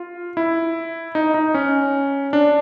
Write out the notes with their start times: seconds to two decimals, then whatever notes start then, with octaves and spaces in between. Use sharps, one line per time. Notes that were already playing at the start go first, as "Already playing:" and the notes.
Already playing: F4
0.37 E4
1.15 D#4
1.34 D#4
1.54 C#4
2.33 D4